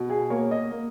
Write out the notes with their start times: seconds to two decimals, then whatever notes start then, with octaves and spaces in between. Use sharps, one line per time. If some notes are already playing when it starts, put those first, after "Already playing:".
Already playing: B2
0.10 G#4
0.30 A#3 C#5
0.51 D#5
0.72 A#3